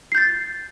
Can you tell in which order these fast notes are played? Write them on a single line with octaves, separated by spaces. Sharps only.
C7 G6 A6